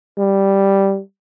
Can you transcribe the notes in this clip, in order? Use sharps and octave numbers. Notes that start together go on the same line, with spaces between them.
G3